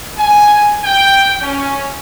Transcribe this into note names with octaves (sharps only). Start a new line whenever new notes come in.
G#5
G5
C#4